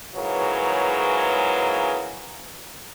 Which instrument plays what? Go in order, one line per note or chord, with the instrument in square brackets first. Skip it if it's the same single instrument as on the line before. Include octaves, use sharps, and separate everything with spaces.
[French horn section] G#2 C#3 E3 F#3 A#4 B4